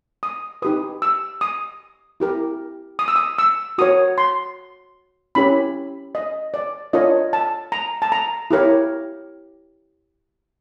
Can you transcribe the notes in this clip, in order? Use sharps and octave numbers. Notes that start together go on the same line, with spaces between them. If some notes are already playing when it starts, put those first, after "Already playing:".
D#6
D#4 G4 B4 D#6
E6
D#6
E4 G4 A#4
D#6
E6
D#6
E6
F#4 A#4 C#5 D#6
C6
C#4 E4 G4 A#4 C#5 B5
D#5
D5
D4 F4 A#4 C#5 D#5
A5
A#5
A5
A#5
E4 G4 A#4 C#5